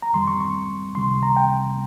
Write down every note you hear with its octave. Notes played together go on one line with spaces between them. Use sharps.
A#5
F2 D#3 G3 C6
C#6
C#6
C#2 C3 D#3 G3 C6
A#5
G5